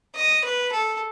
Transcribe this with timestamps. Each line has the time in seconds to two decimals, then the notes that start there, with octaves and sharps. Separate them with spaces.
0.16 D#5
0.44 B4
0.72 A4